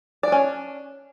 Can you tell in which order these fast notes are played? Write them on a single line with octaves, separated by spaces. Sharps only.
D5 D4 C#4